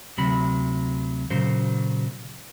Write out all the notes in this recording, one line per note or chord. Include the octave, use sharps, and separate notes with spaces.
D2 C3 F#3 B5
A#2 C#3 F#3 C5